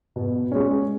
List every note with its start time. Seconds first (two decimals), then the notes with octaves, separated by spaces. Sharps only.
0.16 B2
0.52 G#3 C#4